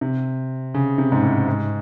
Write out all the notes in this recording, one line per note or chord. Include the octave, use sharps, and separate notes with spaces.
C3
C#3
C3
G#2
A2
G#2